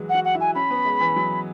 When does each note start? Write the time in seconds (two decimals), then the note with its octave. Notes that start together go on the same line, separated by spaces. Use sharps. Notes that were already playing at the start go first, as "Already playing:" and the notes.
Already playing: E3 F#3 G#3 F#4
0.09 F#5
0.14 F#4
0.25 F#5
0.35 E4
0.40 G#5
0.55 C#4 B5
0.71 B3
0.85 G#3
1.00 E3
1.16 F#3